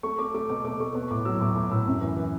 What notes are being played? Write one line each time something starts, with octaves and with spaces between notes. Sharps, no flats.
A3 C#6
A3 D6
A3 D6
B2 D6
A3 D6
A3 C#6
B3 C#6
A2 D6
F#3 E6
A2 D6
A2 D6
A2 E6
F#2
E3
E3